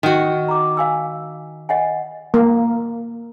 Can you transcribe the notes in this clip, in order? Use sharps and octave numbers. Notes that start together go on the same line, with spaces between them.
D#3 F#4
A#5 D6
F5 G#5 E6
D#5 F#5 G#5
A#3